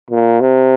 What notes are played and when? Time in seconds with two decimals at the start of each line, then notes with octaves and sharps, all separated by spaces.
0.11 A#2
0.41 C3